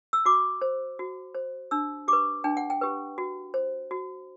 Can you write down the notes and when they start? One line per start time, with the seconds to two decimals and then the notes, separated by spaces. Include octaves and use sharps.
0.13 E6
0.26 F#4 D6
0.62 C5
0.99 F#4
1.35 C5
1.71 D4 E6
2.08 G4 B4 D6
2.44 D4 G5
2.57 F#5
2.70 G5
2.81 G4 B4
3.18 F#4
3.54 C5
3.91 F#4